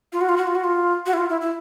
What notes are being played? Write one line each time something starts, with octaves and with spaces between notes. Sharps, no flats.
F4
F#4
F4
F#4
F4
F#4
F4
F#4
E4
F4
E4
E4